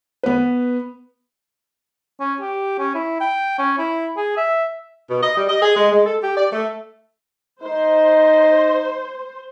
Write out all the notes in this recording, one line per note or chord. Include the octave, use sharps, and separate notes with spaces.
B3 B4
C#4
G4
C#4
E4
G5
C#4
E4
G#4
E5
B2
D#5
G3
D#5
G#4
G#3
G#3
A4
G4
D5
A3
D#4 C5